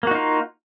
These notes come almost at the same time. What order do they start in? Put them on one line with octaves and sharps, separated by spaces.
A#3 F#4 D#4 F4